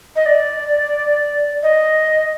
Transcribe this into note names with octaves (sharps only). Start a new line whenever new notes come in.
D#5
D5
D#5